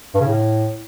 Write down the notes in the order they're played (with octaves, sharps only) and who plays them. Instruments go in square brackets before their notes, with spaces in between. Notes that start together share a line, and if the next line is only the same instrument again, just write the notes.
[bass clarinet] G2
C#3
A2